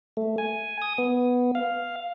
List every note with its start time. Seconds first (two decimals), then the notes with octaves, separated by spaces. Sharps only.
0.17 A3
0.38 G#5
0.82 D#6
0.98 B3
1.55 F5